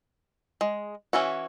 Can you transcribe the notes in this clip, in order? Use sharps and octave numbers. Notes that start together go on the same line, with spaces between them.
G#3
E3 C#4 E4 F#4